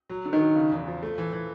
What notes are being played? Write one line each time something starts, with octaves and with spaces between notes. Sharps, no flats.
F#3
D3
D#3
F#3
C#3
E2
F3
A3
E3
E3